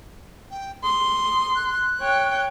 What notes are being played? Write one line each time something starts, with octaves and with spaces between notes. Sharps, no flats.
G5
C6 D#6
F#6
C#5 G5